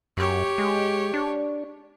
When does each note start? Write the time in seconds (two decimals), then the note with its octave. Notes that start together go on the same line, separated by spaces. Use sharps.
0.17 F#2 G4 C#5
0.58 G#3
1.14 D4